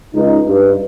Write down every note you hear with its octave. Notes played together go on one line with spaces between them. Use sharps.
C#2 D#4
G2